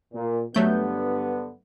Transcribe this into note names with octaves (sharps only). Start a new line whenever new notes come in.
A#2
G2 D3 F#3 A3 B3 G6